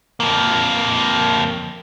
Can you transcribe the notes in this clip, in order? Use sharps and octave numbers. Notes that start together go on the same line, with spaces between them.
F2 A#3